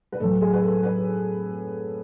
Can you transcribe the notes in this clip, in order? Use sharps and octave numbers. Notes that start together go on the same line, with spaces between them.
B4
A2 F#3 A4
G#4
B4
A4
B4